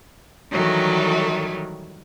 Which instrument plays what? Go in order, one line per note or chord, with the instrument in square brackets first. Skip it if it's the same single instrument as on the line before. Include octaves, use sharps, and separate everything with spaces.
[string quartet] D#3 E3 F#3 G3 A3